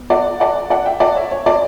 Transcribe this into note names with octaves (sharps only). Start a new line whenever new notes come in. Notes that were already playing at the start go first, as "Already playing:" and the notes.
Already playing: B3
D5 F#5
D5 F#5
D5 F#5
E5 G5
D5 F#5
C#5 E5
C#5
D5